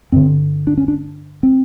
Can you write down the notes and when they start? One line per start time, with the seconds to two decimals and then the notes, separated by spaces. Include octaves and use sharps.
0.12 G2 D3 C4
0.67 D4
0.77 C#4
0.88 D4
1.43 C4